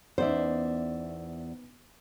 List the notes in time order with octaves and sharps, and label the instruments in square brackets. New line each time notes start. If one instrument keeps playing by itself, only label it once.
[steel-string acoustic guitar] E2 D5 E5 [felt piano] B3 C#4 D#4 [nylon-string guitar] C5